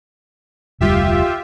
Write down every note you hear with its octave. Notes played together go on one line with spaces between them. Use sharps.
F1 D2 G3 F4 G4 E5